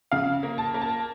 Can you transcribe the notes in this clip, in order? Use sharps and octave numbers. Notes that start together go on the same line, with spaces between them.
C#3 F5
A#3
A5
A#3
A5